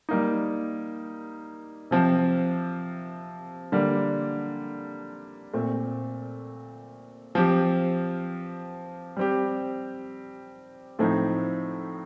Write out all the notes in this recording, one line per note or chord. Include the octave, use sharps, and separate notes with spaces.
G3 A#3 D#4
C3 F3 C4
D3 G3 A#3
A#2 A3 C4
F3 C4 G4
G3 C4 G4
A2 F3 A3 C4 D#4